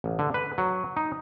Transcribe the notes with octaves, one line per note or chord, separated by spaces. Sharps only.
A1
D3
B4
F#3
D#4